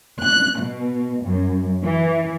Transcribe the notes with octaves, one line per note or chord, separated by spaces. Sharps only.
F#6
B2
F#2
E3